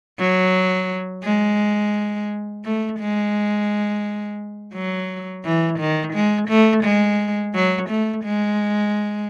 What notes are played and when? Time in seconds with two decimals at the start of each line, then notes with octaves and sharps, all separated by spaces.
0.19 F#3
1.24 G#3
2.65 A3
3.00 G#3
4.74 F#3
5.45 E3
5.79 D#3
6.14 G#3
6.49 A3
6.84 G#3
7.55 F#3
7.90 A3
8.24 G#3